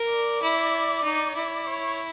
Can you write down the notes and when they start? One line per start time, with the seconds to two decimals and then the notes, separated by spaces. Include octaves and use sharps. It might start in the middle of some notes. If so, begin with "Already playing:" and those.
Already playing: A#4
0.11 D5
0.42 E4
1.04 D#4
1.36 E4
1.67 C#5